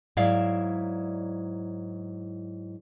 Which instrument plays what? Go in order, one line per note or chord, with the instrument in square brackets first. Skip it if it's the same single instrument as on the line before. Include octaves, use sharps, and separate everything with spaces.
[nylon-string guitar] G#2 F#3 E4 D5 E5 F5